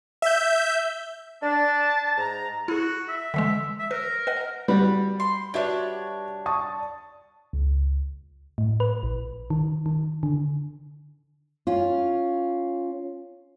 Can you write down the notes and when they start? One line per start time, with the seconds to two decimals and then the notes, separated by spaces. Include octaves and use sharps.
0.22 E5 G6
1.43 D4 A5
2.18 G#2 A#5
2.68 E4 F#4 G#4
3.08 E5
3.34 D3 E3 G#3
3.79 E5
3.91 A#4 B4
4.27 B4 D#5 F#5
4.68 G3 F#4 B4
5.20 C6
5.54 D4 F#4 G4 B4 C#5 E5
6.46 A5 C#6 D#6
7.53 C#2
8.58 A2
8.80 B4
9.03 A#1
9.50 D#3
9.86 D#3
10.23 D3
11.67 C#4 F4